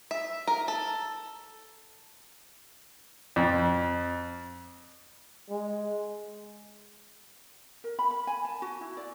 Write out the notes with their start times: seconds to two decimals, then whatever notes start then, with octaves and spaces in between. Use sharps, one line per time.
0.11 E5
0.47 A#4
0.68 A4
3.36 F2
5.49 G#3
7.84 A#4
7.99 B5
8.11 B5
8.27 G#5
8.45 A5
8.62 F#4
8.81 E4
8.97 D5